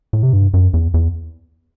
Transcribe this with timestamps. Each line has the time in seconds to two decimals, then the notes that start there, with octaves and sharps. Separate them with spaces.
0.13 A2
0.23 C3
0.33 G2
0.54 F#2
0.74 E2
0.94 E2